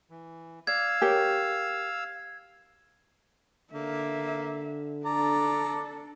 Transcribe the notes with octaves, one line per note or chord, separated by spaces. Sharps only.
E3
D5 F5 E6 G#6
G4 A#4 C#5
D3 A#3 E5
D4 A4 D5 A#5